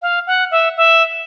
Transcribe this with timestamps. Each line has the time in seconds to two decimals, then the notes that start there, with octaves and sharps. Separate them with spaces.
0.02 F5
0.27 F#5
0.51 E5
0.77 E5